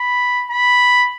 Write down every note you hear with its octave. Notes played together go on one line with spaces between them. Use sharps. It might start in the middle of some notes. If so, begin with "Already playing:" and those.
Already playing: B5
B5